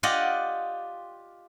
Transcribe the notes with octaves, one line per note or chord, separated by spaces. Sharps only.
F4 G4 D5 D#5 F#5